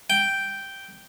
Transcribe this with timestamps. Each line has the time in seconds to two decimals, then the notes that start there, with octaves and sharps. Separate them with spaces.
0.10 G5